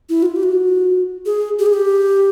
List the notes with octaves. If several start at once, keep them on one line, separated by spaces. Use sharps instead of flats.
E4
F#4
F4
G4
F#4
G#4
G4
G#4
G4